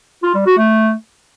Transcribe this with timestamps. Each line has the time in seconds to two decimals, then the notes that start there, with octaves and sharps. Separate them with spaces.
0.23 F4
0.35 G3
0.46 F#4
0.58 A3